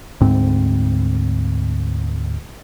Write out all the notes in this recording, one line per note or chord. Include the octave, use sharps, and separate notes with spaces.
D2 G#2 C4